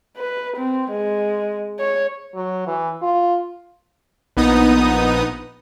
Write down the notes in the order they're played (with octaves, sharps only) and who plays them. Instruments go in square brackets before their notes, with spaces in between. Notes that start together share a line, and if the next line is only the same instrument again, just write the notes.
[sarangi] B4
C4
G#3
C#5
[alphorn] F#3
E3
F4
[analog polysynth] A#1 B3 D#4 D#6